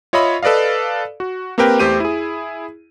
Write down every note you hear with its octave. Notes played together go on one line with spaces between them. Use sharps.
F4 C#5 D#5 E5 B5
A4 B4 D5 D#5 F5
F#4
A#3 C4 G4 A#4 B4 G5
E2 A3 G4 C5 D#7
E4 G#4